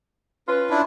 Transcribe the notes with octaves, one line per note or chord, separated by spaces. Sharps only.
C#4 F4 B4
D4 E4